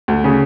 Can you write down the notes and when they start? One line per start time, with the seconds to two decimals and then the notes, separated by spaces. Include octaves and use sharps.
0.08 D2
0.24 C#3